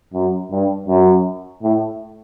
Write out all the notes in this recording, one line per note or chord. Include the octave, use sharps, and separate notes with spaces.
F#2
G2
F#2
A2